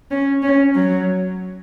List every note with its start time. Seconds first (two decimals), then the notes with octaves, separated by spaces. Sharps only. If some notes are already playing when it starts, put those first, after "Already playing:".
0.11 C#4
0.43 C#4
0.75 F#3